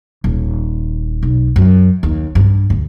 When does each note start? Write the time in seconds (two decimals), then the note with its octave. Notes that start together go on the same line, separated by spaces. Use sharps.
0.24 D#1
1.23 B1
1.56 F#2
2.03 D#2
2.35 G2
2.70 D2